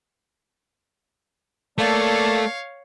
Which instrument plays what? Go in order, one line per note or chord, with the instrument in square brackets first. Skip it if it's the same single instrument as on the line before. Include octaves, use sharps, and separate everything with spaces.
[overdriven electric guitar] A3 [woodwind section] A#3 D5 A5 [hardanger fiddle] C#5 F5